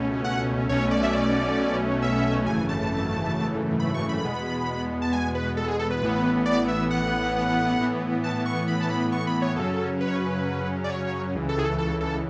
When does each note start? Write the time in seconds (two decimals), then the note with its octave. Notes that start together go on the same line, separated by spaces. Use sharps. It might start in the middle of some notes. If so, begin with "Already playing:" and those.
Already playing: C#2 B2 A3 C#4
0.24 F#5
0.69 B1 B2 A3 C#4 C#5
0.91 D5
1.03 E5
1.13 D5
2.02 E5
2.46 G#1 F#2 C#3 E3 A3 G#5
2.69 A5
3.80 B5
3.94 C#6
4.09 B5
4.24 E2 B2 G#3 B3
5.02 A5
5.13 G#5
5.35 B4
5.57 A4
5.68 G#4
5.79 A4
5.90 B4
6.02 A1 A2 E3 B3
6.46 D5
6.68 E5
6.91 F#5
7.79 A2 E3 B3
8.24 A5
8.46 C#6
8.68 B5
8.80 A5
8.90 B5
9.12 C#6
9.27 B5
9.42 C#5
9.56 F#2 C#3 F#3 C#4 A4
10.01 B4
10.08 C#5
10.15 B4
10.84 D5
10.89 C#5
11.34 C#2 C#3 E3
11.49 A4
11.59 G#4
11.64 A4
11.78 A4
12.01 A4